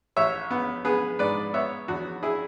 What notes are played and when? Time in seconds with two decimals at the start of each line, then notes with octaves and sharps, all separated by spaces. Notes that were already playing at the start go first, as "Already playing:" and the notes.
0.16 A1 C#5 E5
0.51 B3
0.85 B3 G#4 B4
1.19 G#2 B4 D5
1.54 B3 C#5 E5
1.88 E2 F#4
2.23 E4 G#4